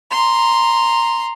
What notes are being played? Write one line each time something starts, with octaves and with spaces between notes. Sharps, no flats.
A#5 C6